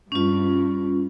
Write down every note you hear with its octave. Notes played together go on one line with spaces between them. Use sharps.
G2 C#4 F4